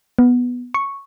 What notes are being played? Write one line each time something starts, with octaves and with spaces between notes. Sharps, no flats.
B3
C#6